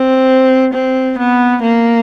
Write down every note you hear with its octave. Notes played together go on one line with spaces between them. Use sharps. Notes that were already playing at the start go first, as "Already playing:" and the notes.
Already playing: C4
C4
B3
A#3